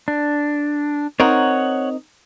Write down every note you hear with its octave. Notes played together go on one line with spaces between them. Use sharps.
D4
C4 D#4 A#4 C#5 F#5